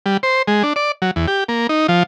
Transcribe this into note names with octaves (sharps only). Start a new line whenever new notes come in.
G3
C5
G#3
D4
D5
F#3
E2
G4
A#3
D#4
F3